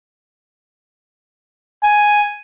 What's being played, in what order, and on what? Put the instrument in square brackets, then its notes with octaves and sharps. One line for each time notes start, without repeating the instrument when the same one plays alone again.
[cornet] G#5